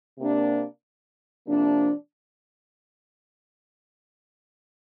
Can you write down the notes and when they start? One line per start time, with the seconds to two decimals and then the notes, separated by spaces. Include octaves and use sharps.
0.18 C3 A#3 D4
1.47 C3 F3 A#3 D4